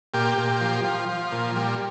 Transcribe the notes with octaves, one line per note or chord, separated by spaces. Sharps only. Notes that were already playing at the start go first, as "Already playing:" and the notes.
A#2 G4
A#2
F3
F3
F3
A#2
G3